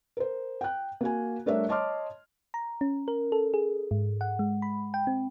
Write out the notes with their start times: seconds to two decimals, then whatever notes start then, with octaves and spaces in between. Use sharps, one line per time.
0.17 A#4 C5
0.61 G5 F#6
1.01 A#3 F#4 G#5
1.46 G3 A3 D4 A#4 C#5 E5
1.69 C#5 D#5 A5 C6 D6 F6
2.54 A#5
2.81 C#4
3.08 A#4
3.32 A4
3.54 G#4
3.91 G#2
4.21 F#5
4.39 G#3
4.62 B5
4.94 G5
5.07 C4